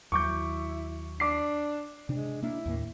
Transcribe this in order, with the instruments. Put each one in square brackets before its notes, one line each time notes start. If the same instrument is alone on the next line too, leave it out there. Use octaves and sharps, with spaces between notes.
[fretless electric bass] D#2 F#3 [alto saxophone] E4 [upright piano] C#6 D6 G6
[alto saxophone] D4 [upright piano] D6 C7
[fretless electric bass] C3 D4 [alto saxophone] G#3
[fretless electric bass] A#3 D4 [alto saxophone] E4
[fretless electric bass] D#2 A2 A#3